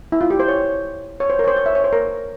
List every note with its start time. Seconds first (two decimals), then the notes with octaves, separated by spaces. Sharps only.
0.12 E4
0.21 F4
0.30 G4
0.40 C5
0.48 C#5
1.20 C#5
1.30 C5
1.39 A#4
1.44 C#5
1.48 C5
1.56 C#5
1.66 E5
1.75 C#5
1.84 C5
1.93 A#4